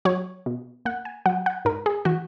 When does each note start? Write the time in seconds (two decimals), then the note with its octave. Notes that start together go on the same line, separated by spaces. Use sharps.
0.05 F#3 C#5
0.46 B2
0.85 A#3 F#5
1.05 G#5
1.26 F#3 F#5
1.46 F#5
1.65 G#2 A#4
1.86 G#4
2.05 E3 F#4